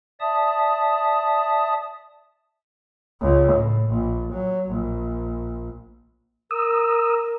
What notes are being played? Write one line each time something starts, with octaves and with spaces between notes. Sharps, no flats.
D5 E5 A5 D#6
C#2
A2
A#1
F#3
A#1
A#4 D#6 E6